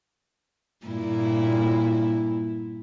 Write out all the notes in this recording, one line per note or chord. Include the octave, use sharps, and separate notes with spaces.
G2 A#2 E4